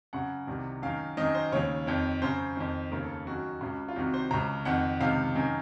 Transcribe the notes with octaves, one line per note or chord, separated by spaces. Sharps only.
F#2 C#3 F#5
C2 C3 D#3
F#2 D#3 F5
F#2 D#3 D#5
C5
D#2 C#3 C#5
F2 D#3
F#2 C#3 C5
F2 D#3
D#2 C#3 A#4
A4
F#2 D#3 F#4
C#2 C#3
F4
C2 C3 D#3 F#4
C5
C#2 C#3 A#5
F2 D#3 F#5
C#2 C3 D#3 F5
F#2 D#3